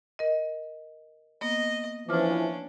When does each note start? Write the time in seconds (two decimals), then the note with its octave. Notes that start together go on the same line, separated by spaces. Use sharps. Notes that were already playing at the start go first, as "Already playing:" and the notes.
0.19 A#4 D#5
1.41 A#3 B3 D#5
2.09 E3 F3 C#4 D4 D6 F6